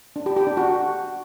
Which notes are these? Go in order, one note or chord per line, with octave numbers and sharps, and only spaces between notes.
D4
G4
G4
D4
F#4